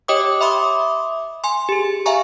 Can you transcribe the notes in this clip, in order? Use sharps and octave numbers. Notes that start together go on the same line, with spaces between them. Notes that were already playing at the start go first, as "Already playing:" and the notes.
G4 C#5 D#5 G5 D6 D#6
E5 B5 C6 D6 D#6
G#5 C6
G4 G#4
E5 F5 G#5 A#5 C#6